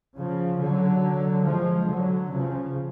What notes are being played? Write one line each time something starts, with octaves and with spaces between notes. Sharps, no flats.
C#3 F3
D3 F#3
F3 G#3
D3 F#3
C#3 F3